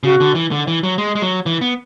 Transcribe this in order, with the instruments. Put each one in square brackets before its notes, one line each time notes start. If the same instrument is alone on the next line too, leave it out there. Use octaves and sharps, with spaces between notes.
[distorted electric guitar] C#3 [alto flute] F#4
[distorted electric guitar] D3
E3
D3
E3
F#3
G#3
G#3
F#3
E3
B3